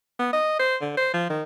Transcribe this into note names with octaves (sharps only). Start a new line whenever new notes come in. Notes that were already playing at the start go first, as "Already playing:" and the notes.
B3
D#5
C5
D3
C5
F3
D#3